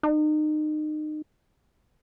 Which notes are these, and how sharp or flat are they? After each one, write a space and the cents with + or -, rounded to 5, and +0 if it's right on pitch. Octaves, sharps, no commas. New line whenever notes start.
D#4 -30